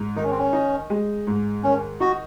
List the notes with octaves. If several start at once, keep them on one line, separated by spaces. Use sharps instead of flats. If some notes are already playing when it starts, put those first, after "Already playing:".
Already playing: G#2
D#3 D#4
C#4
C4
C#4
D#4
G#3
G#2
D#3 C#4
D#4 F#4